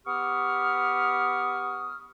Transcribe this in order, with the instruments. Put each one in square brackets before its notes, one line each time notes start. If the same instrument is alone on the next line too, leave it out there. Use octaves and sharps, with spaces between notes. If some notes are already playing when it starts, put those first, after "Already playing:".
[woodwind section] B3 G4 C#6 D#6 F6